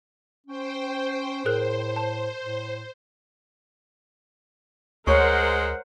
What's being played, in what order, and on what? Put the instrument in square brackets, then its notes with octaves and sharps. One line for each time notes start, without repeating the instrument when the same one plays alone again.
[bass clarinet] C#4 [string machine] C5 G5
[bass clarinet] A2 [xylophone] G#4 A#4 F#6 [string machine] C5
[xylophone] A5
[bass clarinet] A2
[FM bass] D2 [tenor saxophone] G#3 [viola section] A#4 C5 F#5 [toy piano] C#5 C#6